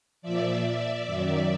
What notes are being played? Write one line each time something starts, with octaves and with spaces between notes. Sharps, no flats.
A#2 F3 D5 E5
D5 E5
F#2 D#3 F#3